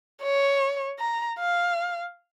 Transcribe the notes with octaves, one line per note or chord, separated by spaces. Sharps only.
C#5
A#5
F5